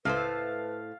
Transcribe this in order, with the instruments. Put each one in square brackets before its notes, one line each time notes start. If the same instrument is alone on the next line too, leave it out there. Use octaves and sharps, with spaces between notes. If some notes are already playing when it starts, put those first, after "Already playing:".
[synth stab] C#2 [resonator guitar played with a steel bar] A2 A3 C5 [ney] B4 [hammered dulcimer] F5